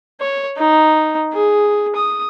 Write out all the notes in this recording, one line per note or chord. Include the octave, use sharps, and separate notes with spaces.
C#5
D#4
G#4
D#6